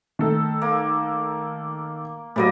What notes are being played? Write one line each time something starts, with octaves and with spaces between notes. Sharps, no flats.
D#3 A3 A4
A#3
A2 F#3 G3 A#3 D#5